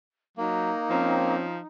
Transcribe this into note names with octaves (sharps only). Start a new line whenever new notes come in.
F#3 A#3 D#4
F3 C4 C#4